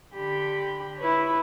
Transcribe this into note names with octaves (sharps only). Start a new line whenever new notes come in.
D3 G4 B5
E4 B4 C#5